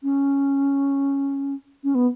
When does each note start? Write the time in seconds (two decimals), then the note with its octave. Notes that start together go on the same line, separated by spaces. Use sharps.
0.03 C#4
1.84 C#4
1.95 B3